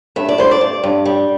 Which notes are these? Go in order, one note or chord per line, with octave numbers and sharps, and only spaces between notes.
G2 E5
D5
G2 C5
D5
G2
G2
G3